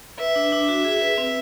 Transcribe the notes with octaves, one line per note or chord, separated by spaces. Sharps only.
B4 E5
D4
D4
F#4
G#4
B4
C4